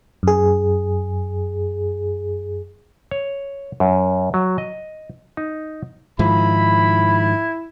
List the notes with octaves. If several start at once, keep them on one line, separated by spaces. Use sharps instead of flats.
F#2 G#4
C#5
F#2
F#3
D#5
D#4
G#2 D#3 F3 E4 B5